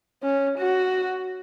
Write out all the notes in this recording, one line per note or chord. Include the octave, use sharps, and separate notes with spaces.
C#4
F#4